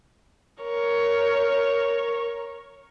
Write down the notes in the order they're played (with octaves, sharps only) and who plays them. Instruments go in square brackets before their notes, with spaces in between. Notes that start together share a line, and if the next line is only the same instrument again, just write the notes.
[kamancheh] A#4 C#5